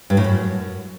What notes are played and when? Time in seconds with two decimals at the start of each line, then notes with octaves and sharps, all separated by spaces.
0.10 G2
0.17 A2
0.24 F#2